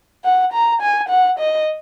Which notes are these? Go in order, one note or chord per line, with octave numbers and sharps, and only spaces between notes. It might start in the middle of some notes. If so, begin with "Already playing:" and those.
F#5
A#5
G#5
F#5
D#5